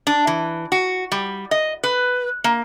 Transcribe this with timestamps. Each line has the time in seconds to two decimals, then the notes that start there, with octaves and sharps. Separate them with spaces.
0.07 D4
0.27 E3
0.72 F#4
1.12 G3
1.51 D#5
1.84 B4
2.44 A#3